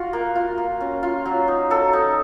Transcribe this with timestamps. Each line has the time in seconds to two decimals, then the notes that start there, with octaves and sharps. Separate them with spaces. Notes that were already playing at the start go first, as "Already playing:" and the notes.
Already playing: F4 F#4
0.13 A#3
0.35 F4
0.58 A#3
0.80 C#4
1.03 F4
1.26 F#3
1.48 D#4
1.70 F#3 A4
1.93 D#4